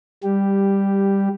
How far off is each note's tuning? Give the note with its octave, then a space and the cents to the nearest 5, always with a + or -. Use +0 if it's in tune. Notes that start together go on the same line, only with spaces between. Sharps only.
G3 +10 G4 +0